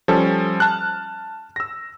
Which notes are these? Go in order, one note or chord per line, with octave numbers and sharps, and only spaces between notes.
F3 G3 C#4 A4
A5 F6 F#6
E6 A#6